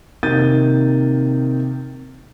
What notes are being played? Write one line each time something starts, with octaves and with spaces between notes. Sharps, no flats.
C3 D#3 A#3 G6 A6 D#7